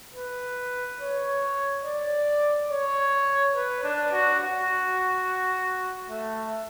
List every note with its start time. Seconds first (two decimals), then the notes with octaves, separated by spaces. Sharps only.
0.14 B4
1.00 C#5
1.84 D5
2.70 C#5
3.55 B4
3.84 D4
4.12 F#4
4.40 F#4
6.10 A3